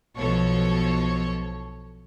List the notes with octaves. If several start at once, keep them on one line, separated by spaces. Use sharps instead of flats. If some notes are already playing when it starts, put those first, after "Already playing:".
B1 B2 F3 A4 C#5 C#6